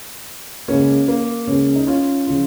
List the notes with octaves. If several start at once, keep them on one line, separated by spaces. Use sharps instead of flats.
C#2 C#3 A#3 C#4
A#3
C#2 C#3 A#3 C#4
D#4
C#4 F4
C#3 F3 C#4 F4